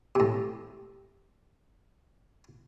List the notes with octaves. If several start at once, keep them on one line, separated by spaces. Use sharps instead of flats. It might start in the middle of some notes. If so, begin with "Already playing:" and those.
A2 C3